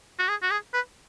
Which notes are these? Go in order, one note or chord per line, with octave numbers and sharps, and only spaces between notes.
F#4
G#4
F#4
G#4
B4